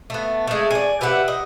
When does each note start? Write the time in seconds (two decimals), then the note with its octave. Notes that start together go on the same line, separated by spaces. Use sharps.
0.10 A3 B3
0.47 G#3 A3
0.71 D5 G#5
1.01 G4 B4 E5 F#5
1.28 D#5